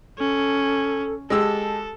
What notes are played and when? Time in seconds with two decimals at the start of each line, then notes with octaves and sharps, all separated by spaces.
0.18 C#4 A4
1.30 G#3 G4 A4 A5 E6